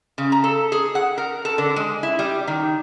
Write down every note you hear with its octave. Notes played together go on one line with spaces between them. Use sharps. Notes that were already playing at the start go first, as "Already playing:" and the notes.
C#3
A#5
A4
G#4
F#5
A#4
A4
D3
G#3
E4
G3
D#3